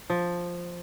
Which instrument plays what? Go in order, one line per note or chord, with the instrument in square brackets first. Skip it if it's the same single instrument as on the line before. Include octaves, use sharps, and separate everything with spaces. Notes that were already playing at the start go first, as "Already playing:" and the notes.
[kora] F3